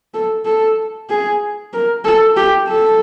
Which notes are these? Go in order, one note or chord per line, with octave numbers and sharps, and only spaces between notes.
A4
A4
G#4
A#4
A4
G4
A4